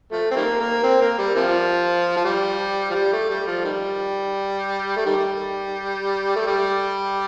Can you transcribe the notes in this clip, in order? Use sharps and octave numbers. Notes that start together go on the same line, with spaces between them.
F3 A3
C4
D#3 G3 A#3
A#3
C4
A#3
G3
C3 F3
F3
G3
F3
G3
A3
G3
F3
D#3 G3
A3
D#3 G3
A3
G3